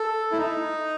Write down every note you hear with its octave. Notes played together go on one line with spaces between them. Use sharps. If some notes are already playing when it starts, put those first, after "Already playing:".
Already playing: A4
E4
D#4